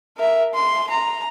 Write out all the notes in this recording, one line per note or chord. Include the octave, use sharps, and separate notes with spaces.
A#4 E5
C6
A#5